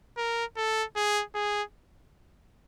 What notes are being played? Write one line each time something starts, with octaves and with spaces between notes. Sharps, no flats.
A#4
A4
G#4
G#4